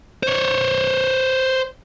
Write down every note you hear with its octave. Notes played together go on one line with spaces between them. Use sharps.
C5 C#5